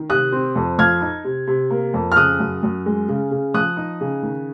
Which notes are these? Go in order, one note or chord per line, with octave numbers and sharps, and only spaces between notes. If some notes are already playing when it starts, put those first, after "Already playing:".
Already playing: D#3
C3 D#6 F#6
C4
F2
F3 F6 G#6
D#4
C3
C3
A#3
F2
F6
C#3 D#6 F#6
F#2
F#2
G#3
C#3
C#3
F3 D#6 F#6
D#4
C#3
D#3